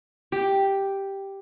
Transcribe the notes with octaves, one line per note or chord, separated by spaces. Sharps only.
G4